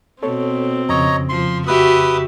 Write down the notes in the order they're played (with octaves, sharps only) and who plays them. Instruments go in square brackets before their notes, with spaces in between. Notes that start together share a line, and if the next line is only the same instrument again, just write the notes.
[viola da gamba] B2 [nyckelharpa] C4 [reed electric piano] A4 C#5
[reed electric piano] F2 C#3 [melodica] C#5 D#5 A#5
[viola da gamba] F3 [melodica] C6
[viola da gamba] F#4 G4 [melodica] B4 D#6 [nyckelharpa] E5